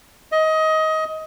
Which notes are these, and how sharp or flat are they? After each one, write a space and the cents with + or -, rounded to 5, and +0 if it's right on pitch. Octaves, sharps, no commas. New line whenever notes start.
D#5 +20